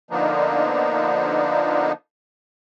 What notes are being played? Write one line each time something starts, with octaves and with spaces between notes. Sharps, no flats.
D3 F3 A#3 B3 D4 D#4